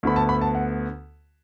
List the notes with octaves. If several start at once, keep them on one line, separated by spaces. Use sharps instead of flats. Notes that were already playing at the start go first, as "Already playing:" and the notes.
D2 D3 B3 B5
A5
B5
A5
F#5